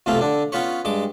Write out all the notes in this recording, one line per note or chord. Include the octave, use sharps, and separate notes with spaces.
B1 F#2 C3 A3 F4 F5
D3 D4
B3 C#4 F4 B4 C#5
G2 G#3 D6